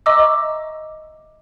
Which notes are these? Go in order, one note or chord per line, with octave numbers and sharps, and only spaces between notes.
D#5 E5 A#5 C#6 D6 E6